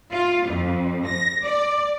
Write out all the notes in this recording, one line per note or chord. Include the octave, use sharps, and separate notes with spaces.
F4
F2
A#6
D5